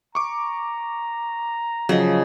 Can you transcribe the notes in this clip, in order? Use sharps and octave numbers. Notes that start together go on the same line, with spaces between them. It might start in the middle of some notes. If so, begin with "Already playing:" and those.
A#5 C#6 D6
C#3 F3 F#3 D#5